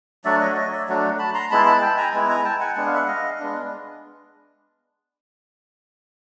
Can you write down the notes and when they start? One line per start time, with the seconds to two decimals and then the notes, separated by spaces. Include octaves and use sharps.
0.25 F#3 A3 D4 F#4 D5 E5
0.41 C#5 D#5
0.56 C#5 D#5
0.72 D5 E5
0.88 F#3 A3 D4 F#4
1.19 A5 B5
1.34 A#5 C6
1.51 G#3 B3 E4 A5 B5
1.66 A5 B5
1.82 G5 A5
1.97 G#5 A#5
2.14 G#3 B3 E4
2.29 G#5 A#5
2.45 G5 A5
2.60 F#5 G#5
2.76 G#3 B3 D4 F#5
2.86 F5
2.94 E5 F#5
3.08 D#5 F5
3.40 G#3 B3 D4